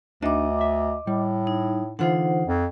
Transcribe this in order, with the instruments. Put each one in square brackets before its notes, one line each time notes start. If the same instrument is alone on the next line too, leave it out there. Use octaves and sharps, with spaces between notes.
[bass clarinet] D2 [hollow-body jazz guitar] D4 D#4 [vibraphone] D#5 D6
[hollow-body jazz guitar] E5
[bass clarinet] A2 [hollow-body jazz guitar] G3
[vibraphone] D#4
[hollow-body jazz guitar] D3 E3 F4 [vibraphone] D#4 C5 F#5
[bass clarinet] F2